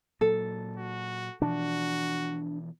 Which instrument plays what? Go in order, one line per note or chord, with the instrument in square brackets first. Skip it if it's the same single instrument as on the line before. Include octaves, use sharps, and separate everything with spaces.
[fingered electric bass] A#2 F#3 [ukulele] A4
[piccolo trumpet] F#4
[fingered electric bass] B2 E3 F3 [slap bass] D4 [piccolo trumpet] F#4